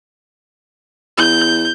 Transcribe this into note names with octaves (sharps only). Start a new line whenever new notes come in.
E2 G6